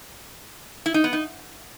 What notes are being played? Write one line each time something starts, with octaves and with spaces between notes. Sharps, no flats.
E4
D#4
B3
D#4